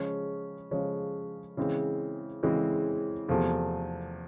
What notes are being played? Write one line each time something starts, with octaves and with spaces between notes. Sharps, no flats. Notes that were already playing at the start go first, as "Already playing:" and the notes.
Already playing: C#3 F3 G#3 C#4
C#3 F3 G#3 C#4
C#3 E3 G#3 C4
C#3 E3 G#3 C4
E2 C3 F3 A3